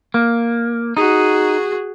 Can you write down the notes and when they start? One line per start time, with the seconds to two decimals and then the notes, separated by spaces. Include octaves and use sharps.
0.14 A#3
0.97 D#4 F#4 G#4